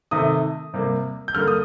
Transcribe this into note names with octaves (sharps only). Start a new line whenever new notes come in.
C3 D#3 A3 D#6
C3 G3 A#3
G6
D3 G3 A#3 F6
D#6